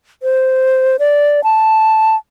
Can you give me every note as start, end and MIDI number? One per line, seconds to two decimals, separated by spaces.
0.23 0.97 72
0.99 1.44 74
1.44 2.16 81